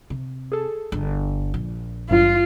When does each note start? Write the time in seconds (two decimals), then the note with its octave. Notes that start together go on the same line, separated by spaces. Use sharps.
0.10 C3
0.52 G#4 A4
0.92 G1
1.54 A#1
2.10 G#1 G2 F#3 F4